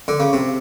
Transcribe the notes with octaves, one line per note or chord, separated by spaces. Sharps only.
D3
C#3
C3